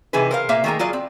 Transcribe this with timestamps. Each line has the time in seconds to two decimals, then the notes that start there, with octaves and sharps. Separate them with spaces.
0.13 C3 E3 D#4 G#4 B4
0.31 A#4 C5 F5
0.49 A#2 A#3 C5 E5 F5
0.64 D#3 A3 A#3 G#4 A#5
0.79 F#3 F4 G#4 D5
0.93 C4